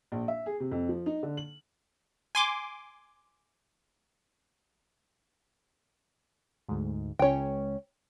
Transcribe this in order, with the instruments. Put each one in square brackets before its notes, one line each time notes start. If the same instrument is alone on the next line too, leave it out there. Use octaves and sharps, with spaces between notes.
[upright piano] A#1
E5
G#4
C3
F2
F3
D#4
D3
F#7
[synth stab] G#5 C6 D6
[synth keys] D2 G#2
[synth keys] C#2 C#4 [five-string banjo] C#5 G5